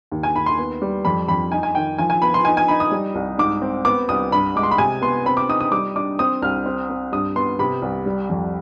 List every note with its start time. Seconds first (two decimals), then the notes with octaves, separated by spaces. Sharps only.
0.12 D#2
0.23 G#5
0.35 D#2 B5
0.46 C6
0.58 B3
0.82 G3
1.05 F2 B5
1.28 F2 B5
1.52 D#4 G#5
1.63 G#5
1.75 D#3 G5
1.98 F3 G#5
2.10 G#5
2.22 B3 B5
2.34 C6
2.45 D#4 G#5
2.57 G#5
2.68 D#4 B5
2.80 D#6
2.91 G3
3.15 C2
3.39 G#2 D6
3.62 C4
3.85 B3 D6
4.09 C2 D#6
4.32 G2 B5
4.55 G#3 D6
4.63 C6
4.71 B5
4.78 C3 G#5
5.02 B3 C6
5.26 C4 B5
5.37 D6
5.49 D#4 D#6
5.60 D#6
5.72 G3 D6
5.96 D4 D6
6.19 C4 D#6
6.42 C2 F6
6.66 C4
6.89 C4
7.12 G2 D#6
7.36 B3 C6
7.59 C3 B5
7.82 C2
8.06 G3
8.30 F2